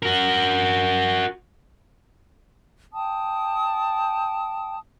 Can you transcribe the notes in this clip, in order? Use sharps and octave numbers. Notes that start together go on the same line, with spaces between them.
F#4 A#4
G5 A5 D#6